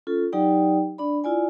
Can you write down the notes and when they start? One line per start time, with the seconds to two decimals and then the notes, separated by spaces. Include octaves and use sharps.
0.07 C#4 F4 A4
0.33 F#3 D#4 G4 D5 G5
0.98 D4 D5 B5
1.24 E4 F4 D5 G#5